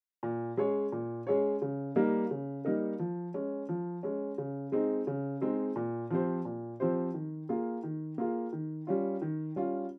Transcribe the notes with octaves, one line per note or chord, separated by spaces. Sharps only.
A#2
G#3 C#4 G#4 C#5
A#2
G#3 C#4 G#4 C#5
C#3
G3 A#3 D#4 A#4
C#3
G3 A#3 D#4 A#4
F3
G#3 C#4
F3
G#3 C#4
C#3
G#3 C4 D#4 G#4
C#3
G#3 C4 D#4 G#4
A#2
F3 C4 G4 C5
A#2
F3 C4 G4 C5
D#3
A#3 F4 G#4
D#3
A#3 F4 G#4
D#3
G3 C#4 F4
D#3
G3 C#4 F4